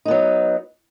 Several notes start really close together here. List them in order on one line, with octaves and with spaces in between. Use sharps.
D#4 B3 F#3